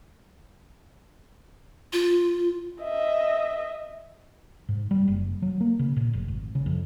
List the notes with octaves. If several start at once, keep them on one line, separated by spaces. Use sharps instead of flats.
F4
D#5 E5
G#2
G3
F#1
F#3
A#3
C#3
A#2
F1
G#1
C#3
F2